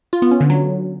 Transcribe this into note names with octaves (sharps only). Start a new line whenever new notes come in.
F4
B3
C#4
D3
F#3